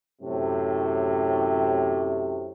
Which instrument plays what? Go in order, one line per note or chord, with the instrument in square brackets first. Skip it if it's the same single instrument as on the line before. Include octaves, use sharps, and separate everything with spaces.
[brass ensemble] F#2 A2 C3